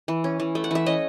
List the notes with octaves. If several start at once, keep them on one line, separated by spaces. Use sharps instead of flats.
E3
C#4
E3
A3
F#5
E3 E5
C#4 D#5